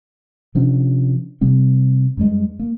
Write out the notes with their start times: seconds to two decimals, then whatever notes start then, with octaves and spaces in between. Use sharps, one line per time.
0.55 C3 F3 C#4 D4
1.41 C3 G3 C4
2.17 F#2 G3 G#3
2.59 A#3